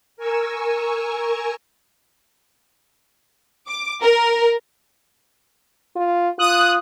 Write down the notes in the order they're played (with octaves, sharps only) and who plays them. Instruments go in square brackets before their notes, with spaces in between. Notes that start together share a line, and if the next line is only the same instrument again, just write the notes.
[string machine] A#4 G#5 C#6 E6
[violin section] D6
A#4
[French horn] F4
[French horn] F4 [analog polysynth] D#6 F#6